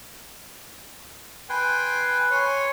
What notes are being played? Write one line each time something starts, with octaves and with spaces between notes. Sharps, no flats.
B4 G5 G#5 C6
C#5 G#5 C6